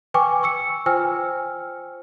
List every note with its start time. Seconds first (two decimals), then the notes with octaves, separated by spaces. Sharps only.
0.14 B4 G5 G#5 C#6 D6
0.43 C#6 E6 C#7
0.86 F4 C5 G5 G#5 E6 F6